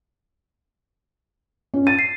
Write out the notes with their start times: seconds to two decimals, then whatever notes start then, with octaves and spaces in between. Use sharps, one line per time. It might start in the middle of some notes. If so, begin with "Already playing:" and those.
1.74 C#4
1.87 A6 D#7
1.99 C7